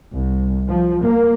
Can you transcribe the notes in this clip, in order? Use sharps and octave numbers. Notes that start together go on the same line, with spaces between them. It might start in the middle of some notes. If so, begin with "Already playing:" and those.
C2
F3
A#3